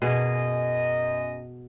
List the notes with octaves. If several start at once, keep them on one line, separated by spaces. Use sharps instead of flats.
F#2 B2 G#4 D#5